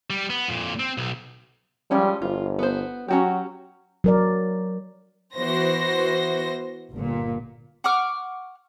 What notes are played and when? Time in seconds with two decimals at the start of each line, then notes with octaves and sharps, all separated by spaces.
0.10 G3
0.30 B3
0.48 F2 A#2
0.80 C4
0.98 B1
1.91 F3 G3 G#3 C#4
2.22 G1 F4
2.59 B3 C5
3.08 F#3 C#4 F#4 G4
4.04 F#3 A#4 D5
5.35 E3 B3 F#4 C5 A#6
6.93 G1 A#2
7.84 F#5 C#6 D6 F6